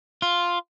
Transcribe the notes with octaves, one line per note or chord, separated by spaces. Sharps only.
F4